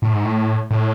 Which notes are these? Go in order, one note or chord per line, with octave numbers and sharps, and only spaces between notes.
A2
G#2
A2
A2